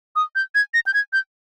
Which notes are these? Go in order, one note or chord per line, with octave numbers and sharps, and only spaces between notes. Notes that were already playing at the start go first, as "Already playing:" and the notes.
D#6
G6
G#6
A#6
G6
G#6
G6